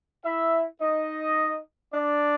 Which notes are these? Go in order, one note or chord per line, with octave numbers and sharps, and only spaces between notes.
E4 E5
D#4 D#5
D4 D5